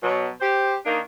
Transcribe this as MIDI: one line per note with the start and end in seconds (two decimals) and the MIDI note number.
0.03 0.29 47
0.03 0.29 54
0.41 0.76 67
0.41 0.76 72
0.86 1.00 51
0.86 1.00 58
0.86 1.00 62
0.86 1.00 63